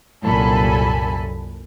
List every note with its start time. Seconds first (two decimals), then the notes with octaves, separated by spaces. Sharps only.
0.24 C2 F#2 A#2 A4 G#5 B5